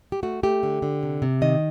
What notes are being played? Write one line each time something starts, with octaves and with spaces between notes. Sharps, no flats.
G4
A3 F#4
A3 G4
D3
D3
C3
C3
D#3 D#5